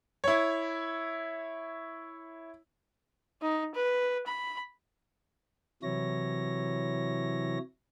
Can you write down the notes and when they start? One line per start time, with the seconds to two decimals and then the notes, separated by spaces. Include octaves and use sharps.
0.24 E4 C#5
3.42 D#4
3.75 B4
4.27 B5
5.83 C3 E3 F#3 E4 C#5 A#6